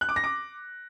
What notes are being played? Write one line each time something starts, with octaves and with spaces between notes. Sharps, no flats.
F#6
D6
A#6
D6